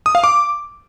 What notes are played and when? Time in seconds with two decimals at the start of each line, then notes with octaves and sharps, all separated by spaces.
0.06 D#6
0.15 F5
0.24 D6